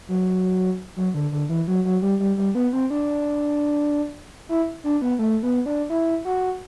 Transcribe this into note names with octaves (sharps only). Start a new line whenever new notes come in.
F#3
F#3
D3
D3
E3
F#3
F#3
G3
G3
G3
B3
C4
D4
E4
D4
B3
A3
B3
D4
E4
F#4